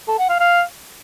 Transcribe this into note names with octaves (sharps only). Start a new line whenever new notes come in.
A4
F#5
F5
F5